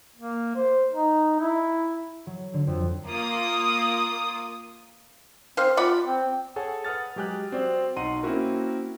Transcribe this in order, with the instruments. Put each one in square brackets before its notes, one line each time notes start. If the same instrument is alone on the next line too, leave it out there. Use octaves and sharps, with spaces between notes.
[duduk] A#3
C5
D#4
E4
[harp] F#3
D3
F2
[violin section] A#3 F4 D#6
[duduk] C4 [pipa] C5 F5
[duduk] F4 [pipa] D5 F#5 B5
[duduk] C4
[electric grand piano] G#4 A4 C#5 F#5 G#5 A5
B4 F#5 D#6 F6 A6
F#3 G#3 G4 G#5 F#6
C4 F#4 C5 D5
B1 D#4 F#5 C6 D#7
A#3 C4 C#4 E4 F#4 A#4